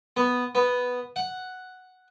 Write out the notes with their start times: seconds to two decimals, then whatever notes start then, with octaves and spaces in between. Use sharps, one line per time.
0.17 B3
0.55 B3
1.16 F#5